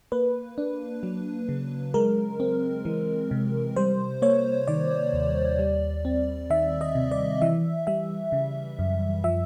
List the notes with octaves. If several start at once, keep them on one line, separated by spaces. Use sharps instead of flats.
A#3 B4
D4
F#3
C#3
G#3 A#4
C4
E3
C3
G3 C5
A#3 C#5
D#3 D5
D#2
G3
C4
D#3 E5
D#5
C3
D5
E3 E5
G3 E5
C#3
F#2
F3 E5